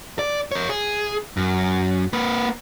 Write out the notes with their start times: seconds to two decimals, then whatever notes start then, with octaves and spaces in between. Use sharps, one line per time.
0.19 D5
0.52 A#4 C#5
0.69 G#4
1.37 F#2
2.13 A#3 B4